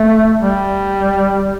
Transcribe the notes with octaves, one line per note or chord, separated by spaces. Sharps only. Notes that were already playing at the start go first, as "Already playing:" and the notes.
Already playing: A3
G3